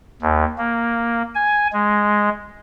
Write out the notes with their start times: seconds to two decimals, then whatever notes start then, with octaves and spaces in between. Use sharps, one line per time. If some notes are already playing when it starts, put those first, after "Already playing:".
0.22 D#2
0.58 A#3
1.35 G#5
1.73 G#3